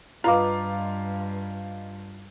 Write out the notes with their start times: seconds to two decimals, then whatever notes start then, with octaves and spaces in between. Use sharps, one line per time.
0.24 G2 F4 B4 D#5 F5 A#5 D6